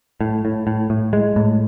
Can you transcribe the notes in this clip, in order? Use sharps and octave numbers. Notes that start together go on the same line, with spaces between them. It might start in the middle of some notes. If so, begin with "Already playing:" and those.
A2
A2
A2
A2
G#3
A2